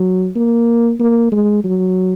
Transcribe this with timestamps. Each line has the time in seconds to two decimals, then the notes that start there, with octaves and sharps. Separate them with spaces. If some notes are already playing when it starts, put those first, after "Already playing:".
Already playing: F#3
0.36 A#3
1.00 A#3
1.32 G#3
1.64 F#3